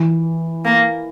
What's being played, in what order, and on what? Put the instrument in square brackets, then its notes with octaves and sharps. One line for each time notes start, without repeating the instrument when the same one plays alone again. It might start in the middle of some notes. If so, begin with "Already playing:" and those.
Already playing: [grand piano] E3
[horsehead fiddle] A#3